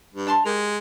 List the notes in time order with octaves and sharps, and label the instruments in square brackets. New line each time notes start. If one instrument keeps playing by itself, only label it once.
[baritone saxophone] G2
[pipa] D4 A5 C6
[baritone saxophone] G#3 [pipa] G4 A#4